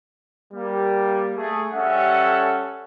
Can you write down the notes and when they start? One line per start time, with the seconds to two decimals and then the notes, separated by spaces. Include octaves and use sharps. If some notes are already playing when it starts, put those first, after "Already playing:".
0.52 G3 A#3
1.36 A3 G#4
1.73 G3 C#4 A4 E5 F#5